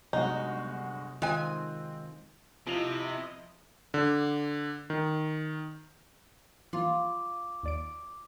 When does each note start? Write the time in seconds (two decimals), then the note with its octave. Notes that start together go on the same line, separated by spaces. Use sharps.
0.13 G1 C3 F#3 G#3 D#4 F#4
1.22 D#3 G#3 C4 F4 G#5
2.67 C3 F3 E4 D#5 F7
3.94 D3
4.90 D#3
6.73 E3 F3 A#3 F4 D6
7.63 D#2 D5 D7